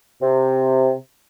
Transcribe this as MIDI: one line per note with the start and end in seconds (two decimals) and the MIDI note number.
0.21 0.92 48